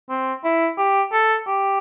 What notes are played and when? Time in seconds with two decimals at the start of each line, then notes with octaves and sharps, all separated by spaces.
0.10 C4
0.44 E4
0.78 G4
1.12 A4
1.47 G4